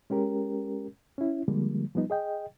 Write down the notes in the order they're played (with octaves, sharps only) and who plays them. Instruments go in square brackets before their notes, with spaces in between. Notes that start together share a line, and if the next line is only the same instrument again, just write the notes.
[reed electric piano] G#3 C#4 G4 A#4
C#4 E4
D3 F3 G3 G#3 A#3
F3 G3 B3 D#4
G#4 D#5 G5